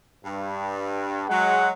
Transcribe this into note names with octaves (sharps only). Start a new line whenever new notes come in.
G2
F#3 G#3 F#5